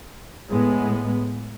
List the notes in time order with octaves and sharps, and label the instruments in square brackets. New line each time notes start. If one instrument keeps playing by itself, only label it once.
[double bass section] A2 G#3 B3